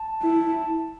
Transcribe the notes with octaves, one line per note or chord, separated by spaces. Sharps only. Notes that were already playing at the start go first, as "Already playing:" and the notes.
Already playing: A5
E4